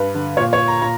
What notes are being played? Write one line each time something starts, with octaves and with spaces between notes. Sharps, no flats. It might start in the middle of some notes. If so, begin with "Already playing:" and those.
Already playing: G2 B4
D3
A#2 C#5
C#5
A#5
A#2 A#5